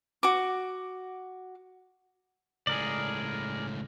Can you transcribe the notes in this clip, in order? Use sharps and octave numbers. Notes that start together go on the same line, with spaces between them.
F#4 D6
C#2 A2 G#4 A#4 D5